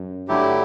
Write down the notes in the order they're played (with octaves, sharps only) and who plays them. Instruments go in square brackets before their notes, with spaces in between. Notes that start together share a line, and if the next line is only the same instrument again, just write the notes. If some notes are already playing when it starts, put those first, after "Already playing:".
Already playing: [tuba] F#2
[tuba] G2 [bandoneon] D3 F#3 A3 E4 G4